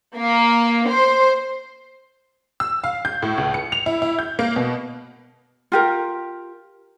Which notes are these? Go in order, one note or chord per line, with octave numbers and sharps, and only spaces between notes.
A#3
C5
E6
F5
G6
A2
C#2
C#7
F7
E4
E4
G6
A#3
B2
F4 G4 A#4